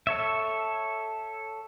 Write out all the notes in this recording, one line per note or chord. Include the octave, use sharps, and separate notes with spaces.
A4 C#5 E5